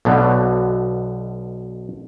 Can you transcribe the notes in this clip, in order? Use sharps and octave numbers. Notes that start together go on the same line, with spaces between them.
B1 B2 D3